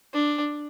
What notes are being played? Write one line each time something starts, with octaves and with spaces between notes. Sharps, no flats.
D4